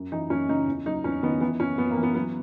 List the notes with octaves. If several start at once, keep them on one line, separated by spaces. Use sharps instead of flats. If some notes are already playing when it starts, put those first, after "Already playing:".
Already playing: F#2
E3 D#4
F#2 C#4
C#3 D#4
E2
F#3 D#4
E2 C#4
D#3 B3
E3 B3
F#2 C#4
F#2 B3
A#3
E3
B3
F#3 B3